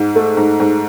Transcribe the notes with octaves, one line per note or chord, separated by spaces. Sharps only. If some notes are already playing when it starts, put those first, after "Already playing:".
Already playing: G#2
A3
G#2
G#2